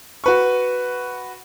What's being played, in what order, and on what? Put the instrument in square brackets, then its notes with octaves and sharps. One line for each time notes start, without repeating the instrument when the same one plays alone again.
[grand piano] F#4 B4 C#6